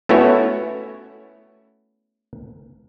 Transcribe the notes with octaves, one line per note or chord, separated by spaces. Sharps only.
A3 B3 C#4 E4 F#4 C#5